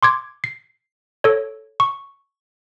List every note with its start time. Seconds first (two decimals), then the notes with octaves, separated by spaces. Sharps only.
0.03 C6 D6 G#6
0.44 C7
1.24 A4 C#5
1.80 C#6